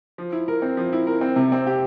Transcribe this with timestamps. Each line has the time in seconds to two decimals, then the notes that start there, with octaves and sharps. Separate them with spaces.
0.18 F3
0.32 E4
0.48 A#4
0.62 C4
0.77 F3
0.93 E4
1.07 A#4
1.21 C4
1.36 C3
1.52 C4
1.67 G4